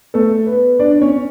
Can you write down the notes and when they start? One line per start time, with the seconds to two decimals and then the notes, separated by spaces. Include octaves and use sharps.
0.14 A3 A4
0.46 B3 B4
0.79 D4 D5
1.01 C#4 C#5